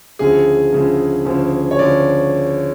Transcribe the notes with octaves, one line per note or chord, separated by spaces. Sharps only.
D2 C#3 F3 G#4
D2 C#3 F3
D2 C#3 F3
C#5
D2 C#3 F3 D5